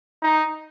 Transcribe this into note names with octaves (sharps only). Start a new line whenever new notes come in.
D#4